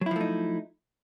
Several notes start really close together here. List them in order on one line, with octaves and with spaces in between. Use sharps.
F#3 E4 F3 A3 D#4